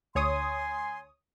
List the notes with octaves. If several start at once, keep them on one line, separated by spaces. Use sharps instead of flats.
D2 C#5 G#5 C6 D#6